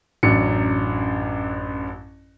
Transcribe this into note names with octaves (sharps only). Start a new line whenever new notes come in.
A1 F#2 F#3 D4 C#7